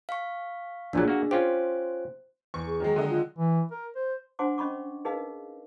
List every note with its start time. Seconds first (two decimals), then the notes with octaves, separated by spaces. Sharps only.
0.09 F5 C#6
0.93 A#1 A#2 F#3 D4 G#4
1.08 A#3 F#4
1.31 C#4 F4 G4 C5
2.54 E2 C#6
2.66 G#4
2.80 D#3 F#3 G#3
2.96 D3 A4 D#5
3.09 F4
3.39 E3
3.71 A#4
3.96 C5
4.39 D4 C5 F#5 G#5 C6 D6
4.58 C#4 D#5 B5 C#6 D6
5.05 D#4 G#4 A#4 B4 D#5 F5